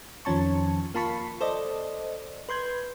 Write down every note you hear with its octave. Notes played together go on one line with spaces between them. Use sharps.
F2 D#3 F3 C#4 A5 C#6
A#3 F4 A5 B5 C#6 B6
A4 C5 D5 D#5
B4 C6 G6 G#6